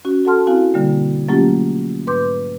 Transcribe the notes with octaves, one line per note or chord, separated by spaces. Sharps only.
C#4 F#4
F#4 A4 F#5 A5 C6 F6
C4 E4 F#4 F5 G#5
B2 D3 G3 A#3
F#3 A3 A#3 C#4 F4 G4
G#2 B4 C6 D6 G6